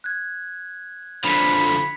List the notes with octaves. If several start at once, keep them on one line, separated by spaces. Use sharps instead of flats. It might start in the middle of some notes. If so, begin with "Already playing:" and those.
F#6 G#6
D3 F3 B5 B6 C#7 F7